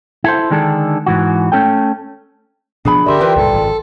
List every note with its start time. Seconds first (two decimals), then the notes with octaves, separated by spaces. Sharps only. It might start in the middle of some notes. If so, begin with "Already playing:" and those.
0.24 E4 A4 C5
0.51 D3 D#3 G#3 D4 G#4 A4
1.06 G#2 E3 F#4
1.52 A3 C#4 A4 G5
2.85 B2 F3 B3 D4 G#4 B5
3.06 G2 D3 G4 A#4 D5 E5 C6
3.21 E3 F4 B4 G5
3.36 C#2 G2 A#2 A4
3.54 G#1 F#2